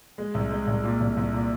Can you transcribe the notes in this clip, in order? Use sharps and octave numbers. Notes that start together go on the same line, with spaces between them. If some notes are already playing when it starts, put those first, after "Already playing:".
G#3
C2
G#3
C2
A#2
C2
C2
A#2